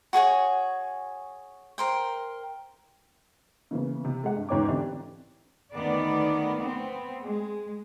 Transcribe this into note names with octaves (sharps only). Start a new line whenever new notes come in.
F#4 G#4 C#5 G#5
A#4 C5 G5
C#3 E3 A#3 B3
C3
G#3 F#5
G2
E2 G#2 C#4 C#5 G5 D6
D3 E3 C4 D4 G4 B4
D2 D#3 B3 D5
B3 C4
G#3